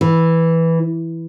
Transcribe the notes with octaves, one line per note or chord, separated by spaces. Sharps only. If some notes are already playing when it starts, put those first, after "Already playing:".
E3